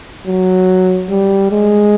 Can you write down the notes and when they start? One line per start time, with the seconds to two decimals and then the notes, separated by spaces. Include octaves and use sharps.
0.27 F#3
1.10 G3
1.51 G#3